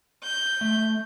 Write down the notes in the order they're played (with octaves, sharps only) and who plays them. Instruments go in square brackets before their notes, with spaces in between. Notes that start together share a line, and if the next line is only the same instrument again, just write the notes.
[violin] G6
[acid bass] A3